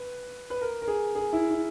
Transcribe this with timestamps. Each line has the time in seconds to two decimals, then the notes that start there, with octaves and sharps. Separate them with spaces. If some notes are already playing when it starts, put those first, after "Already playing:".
Already playing: B4
0.50 B4
0.61 A#4
0.82 A#4
0.88 G#4
1.15 G#4
1.33 E4
1.51 E4